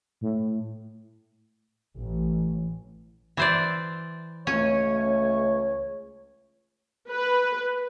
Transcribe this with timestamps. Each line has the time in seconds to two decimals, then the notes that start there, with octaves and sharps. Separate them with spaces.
0.21 A2
1.96 A1
3.37 E3 C5 D5
4.47 C#2 A3 C#4 C#5
7.10 B4